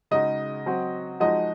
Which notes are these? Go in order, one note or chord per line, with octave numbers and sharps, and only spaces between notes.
C#3 G#3 D#4 F#4 D#5
F#3 C4 F#4
F3 G#3 D#4 F#4 D#5